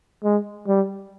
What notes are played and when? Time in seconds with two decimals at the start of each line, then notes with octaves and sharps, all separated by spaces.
0.24 G#3
0.68 G3